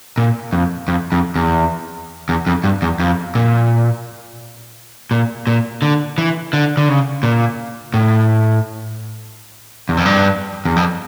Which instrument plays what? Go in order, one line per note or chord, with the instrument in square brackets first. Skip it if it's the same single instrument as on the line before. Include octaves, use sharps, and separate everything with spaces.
[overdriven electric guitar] A#2
F2
F2
F2
E2
E2
F2
G2
E2
F2
A#2
A#2
A#2
D3
E3
D3
D3
C#3
A#2
A2
E2
F2
G2
E2
F2